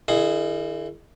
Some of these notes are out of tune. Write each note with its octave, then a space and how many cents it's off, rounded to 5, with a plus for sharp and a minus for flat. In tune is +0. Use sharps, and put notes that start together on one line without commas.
D#3 -35 E4 +20 G#4 +0